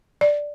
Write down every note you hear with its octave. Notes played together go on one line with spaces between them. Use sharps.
D5